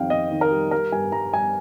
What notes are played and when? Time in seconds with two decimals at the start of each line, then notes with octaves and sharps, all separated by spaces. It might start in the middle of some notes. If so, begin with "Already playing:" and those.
Already playing: F2 D#3 G3 F5 G5
0.10 F2 D#5
0.31 D#3
0.41 A#4
0.51 G3
0.71 G3 A#4
0.92 G2 G#5
1.12 G2 A#5
1.33 G3 G#5